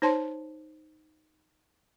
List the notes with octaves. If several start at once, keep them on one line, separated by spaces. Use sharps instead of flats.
D#4 C5 C#5 A5 C6